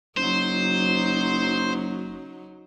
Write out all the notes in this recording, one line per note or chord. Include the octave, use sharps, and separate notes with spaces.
F#1 F#3 D#4 C5